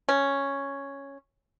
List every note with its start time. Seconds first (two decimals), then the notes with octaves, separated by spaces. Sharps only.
0.09 C#4